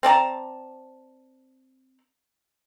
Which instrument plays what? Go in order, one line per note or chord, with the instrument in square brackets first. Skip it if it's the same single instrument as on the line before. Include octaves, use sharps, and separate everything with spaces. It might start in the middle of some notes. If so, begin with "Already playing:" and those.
[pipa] C4 D5 A5 A#5